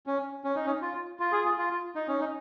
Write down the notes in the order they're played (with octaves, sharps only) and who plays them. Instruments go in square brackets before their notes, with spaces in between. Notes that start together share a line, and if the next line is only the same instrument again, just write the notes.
[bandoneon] C#4
C#4
D#4
C#4
F4
F4
G#4
F4
F4
D#4
C#4
D#4